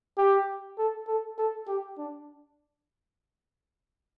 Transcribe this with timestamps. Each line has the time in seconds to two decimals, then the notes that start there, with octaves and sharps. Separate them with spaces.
0.18 G4
0.78 A4
1.08 A4
1.38 A4
1.67 G4
1.98 D4